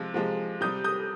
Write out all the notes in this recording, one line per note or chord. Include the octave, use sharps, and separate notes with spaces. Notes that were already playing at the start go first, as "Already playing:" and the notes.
Already playing: C3 F3 G#3
C3 F3 G#3
C3 G3 D#6 G6
D#6 G6